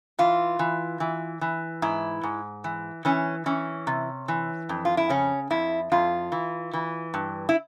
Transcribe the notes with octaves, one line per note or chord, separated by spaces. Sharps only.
E3 F4
E3
E3
E3
G#2 E4
G#2
E3
E3 C#4
E3 C#4
C3
E3
F2
F4
E4
C#3 C#4
F2 E4
F2 F4
E3
E3
G2
E4